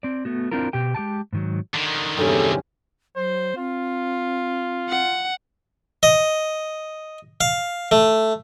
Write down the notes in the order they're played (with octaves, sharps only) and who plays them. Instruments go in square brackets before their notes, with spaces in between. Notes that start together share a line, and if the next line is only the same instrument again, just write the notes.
[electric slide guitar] C4 D5
A3 B3 F#4
C4 D4 E4 F4 A#4
B2 G4 G5
G#3 G4 G5 A5
G#2 D#3 F#3
[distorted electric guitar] D3 D#3
[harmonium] E2 C3 C#4 [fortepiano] G2 G3 [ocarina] A4
[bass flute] F#3 [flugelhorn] C5
[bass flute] C4 [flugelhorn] F4
[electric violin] F#5
[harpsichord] D#5
F5
A3